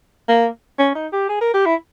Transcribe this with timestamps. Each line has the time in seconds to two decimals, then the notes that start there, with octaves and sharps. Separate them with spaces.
0.29 A#3
0.79 C#4
0.95 D#4
1.12 G4
1.29 G#4
1.41 A#4
1.54 G4
1.66 E4